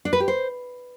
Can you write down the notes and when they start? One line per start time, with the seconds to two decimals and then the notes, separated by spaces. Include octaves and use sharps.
0.05 D4
0.13 B4
0.20 G4
0.28 C5